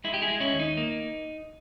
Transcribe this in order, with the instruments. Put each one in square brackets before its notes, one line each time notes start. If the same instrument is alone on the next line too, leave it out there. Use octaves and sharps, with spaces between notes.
[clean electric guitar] G#3 E4
G4
E4 G#4
G#3
C#4 E4
D#2
D#4
A#3